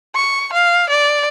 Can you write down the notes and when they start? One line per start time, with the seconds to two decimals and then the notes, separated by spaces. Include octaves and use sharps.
0.15 C#6
0.53 F5
0.89 D5